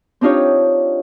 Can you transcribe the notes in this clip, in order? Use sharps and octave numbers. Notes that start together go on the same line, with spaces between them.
C4 D4 D#4 F4 G4 C#5